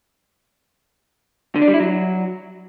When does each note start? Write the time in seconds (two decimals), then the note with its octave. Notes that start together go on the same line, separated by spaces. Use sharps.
1.56 D3
1.62 D4
1.68 G3
1.74 E4
1.80 F#3